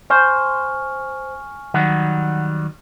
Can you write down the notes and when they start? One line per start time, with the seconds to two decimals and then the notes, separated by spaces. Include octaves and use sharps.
0.10 C5 G#5 C#6 F6
1.74 D#3 F#3 G3 F#5